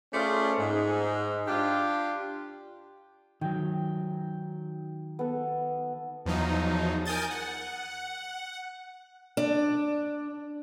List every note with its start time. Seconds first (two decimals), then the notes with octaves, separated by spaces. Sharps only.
0.13 A3 C#4 F4 G#4 C5 D5
0.58 G#2
1.47 D4 F4 G4
3.41 D#3 F#3 G5
5.19 B3 A4
6.26 E2 F3 F#3 D#4
7.05 A#4 G#5 D#6 G6 A6
7.31 F#5
9.37 D4